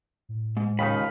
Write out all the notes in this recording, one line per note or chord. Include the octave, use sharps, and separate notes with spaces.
A2
G#2
D#2 C#3 D#4 F4 B5